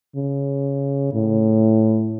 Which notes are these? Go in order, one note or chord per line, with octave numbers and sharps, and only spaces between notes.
C#3
A2